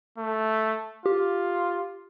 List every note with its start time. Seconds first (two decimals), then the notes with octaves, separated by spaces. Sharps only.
0.18 A3
1.06 F4 G4